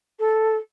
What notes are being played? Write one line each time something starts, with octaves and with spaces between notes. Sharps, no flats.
A4